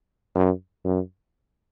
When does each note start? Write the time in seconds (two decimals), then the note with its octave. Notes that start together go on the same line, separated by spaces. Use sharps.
0.35 F#2
0.84 F#2